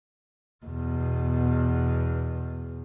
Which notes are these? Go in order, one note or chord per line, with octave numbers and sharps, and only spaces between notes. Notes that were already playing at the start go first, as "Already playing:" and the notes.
E2 B2